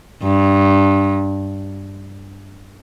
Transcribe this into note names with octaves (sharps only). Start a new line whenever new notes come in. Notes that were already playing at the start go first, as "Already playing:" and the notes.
G2